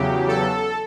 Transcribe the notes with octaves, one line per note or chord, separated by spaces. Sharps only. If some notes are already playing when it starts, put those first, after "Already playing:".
Already playing: E2 C#3 F#3 G4
A4